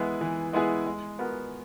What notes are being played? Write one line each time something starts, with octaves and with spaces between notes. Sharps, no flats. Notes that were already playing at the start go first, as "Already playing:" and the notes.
Already playing: E3 G#3 B3 E4 G#4
E3
G#3 B3 E4 G#4
G#3
B3 F#4 A#4